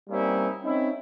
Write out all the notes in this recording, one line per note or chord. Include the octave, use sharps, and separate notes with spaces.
G3 A#3 C4 C#4 D#4 E4
C4 C#4 D#4 E4